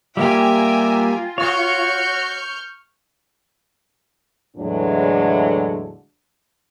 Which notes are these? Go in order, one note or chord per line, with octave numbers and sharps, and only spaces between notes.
G3 A#3 F4 G4 E5 G5 G#5 A#5
F#4 C#5 C#6 F6 G6
E2 A2 D3 F#3 G#3 D4